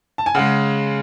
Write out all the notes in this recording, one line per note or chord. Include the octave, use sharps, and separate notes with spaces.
A5
G#5
C#3 G#3 F#5